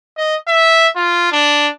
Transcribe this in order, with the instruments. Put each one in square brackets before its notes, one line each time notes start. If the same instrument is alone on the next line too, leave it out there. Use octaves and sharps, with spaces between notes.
[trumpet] D#5
E5
F4
D4